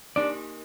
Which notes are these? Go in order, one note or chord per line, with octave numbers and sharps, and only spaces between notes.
A#3 D4 D#4 G4 A#4 D5